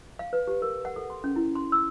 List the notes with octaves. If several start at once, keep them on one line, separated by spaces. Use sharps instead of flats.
F5
B4
G4
A#4
F#5
A4
C6
C#4
E4
C6
E6